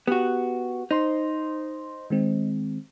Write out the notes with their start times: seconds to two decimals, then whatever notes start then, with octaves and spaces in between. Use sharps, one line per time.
0.07 B3 F#4 G4
0.91 D#4 C5 C6
2.10 D#3 G#3 C4